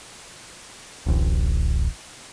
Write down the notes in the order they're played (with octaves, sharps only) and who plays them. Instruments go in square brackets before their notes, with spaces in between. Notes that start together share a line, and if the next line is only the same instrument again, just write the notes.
[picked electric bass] D1 A1